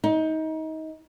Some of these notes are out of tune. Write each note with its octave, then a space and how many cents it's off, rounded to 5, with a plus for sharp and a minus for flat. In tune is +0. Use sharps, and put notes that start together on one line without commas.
D#4 +25